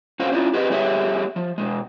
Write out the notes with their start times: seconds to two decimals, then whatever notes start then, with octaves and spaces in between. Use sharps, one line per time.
0.20 C#4 F#4 C5 F5
0.32 C#4 D4 E4 F4
0.53 G4 G#4 B4 D#5
0.70 G3 B3 G4 G#4 C#5 E5
1.36 F3
1.58 B2 G#3